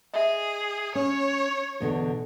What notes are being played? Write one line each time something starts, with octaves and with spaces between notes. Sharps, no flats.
G#4 D#5 E5
C#4 C#5
E2 B2 D3